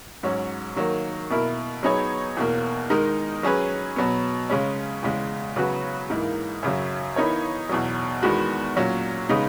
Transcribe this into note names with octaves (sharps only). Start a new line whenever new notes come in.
G#2 F#3 C#4
D#3 F#3 A#3
B2 A#3 E4 A#4
F#3 B3 D#4 G#4 C#5
E2 B2 A#3
D#3 G#3 D#4 A#4
F#3 C#4 G#4 B4
B2 F#3 B3
C#3 G#3 C#4
E2 C#3 G#3
C#3 F#3 B3 F#4 B4
G#2 E3 A#3 D#4 A#4
F#2 C#3 F#3
E3 B3 D#4 A#4 C#5
E2 B2 F#3
E2 D#3 G#3 B3 F#4
A#2 F#3 C#4
C#3 G#3 B3 D#4